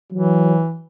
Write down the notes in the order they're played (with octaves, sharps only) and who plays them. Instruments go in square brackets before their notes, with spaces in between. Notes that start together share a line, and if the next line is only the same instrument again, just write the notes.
[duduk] E3 [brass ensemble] F#3